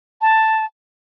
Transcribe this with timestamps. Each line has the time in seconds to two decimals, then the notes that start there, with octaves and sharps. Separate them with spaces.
0.21 A5